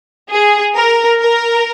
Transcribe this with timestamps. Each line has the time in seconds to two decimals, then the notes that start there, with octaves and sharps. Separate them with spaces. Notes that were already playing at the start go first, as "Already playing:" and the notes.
0.30 G#4
0.75 A#4
1.18 A#4